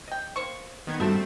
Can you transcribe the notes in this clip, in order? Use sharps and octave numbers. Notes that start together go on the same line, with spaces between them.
D#5 G5
A#3 C5 C#6
D#3 B3 G#6
G2 G3 A3 C4 D4 F#4 E7